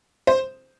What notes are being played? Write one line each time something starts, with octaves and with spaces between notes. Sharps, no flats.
C5